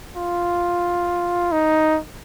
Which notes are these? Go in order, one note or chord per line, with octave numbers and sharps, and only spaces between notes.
F4
D#4